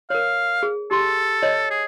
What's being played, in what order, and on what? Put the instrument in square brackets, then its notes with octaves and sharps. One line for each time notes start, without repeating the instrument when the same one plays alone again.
[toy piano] A#4 C#5 [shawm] F5
[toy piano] G#4
[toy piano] G4 C6 [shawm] A4
[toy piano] C#5 D#5
[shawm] G#4